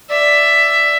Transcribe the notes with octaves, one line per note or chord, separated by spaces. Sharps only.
D5 E5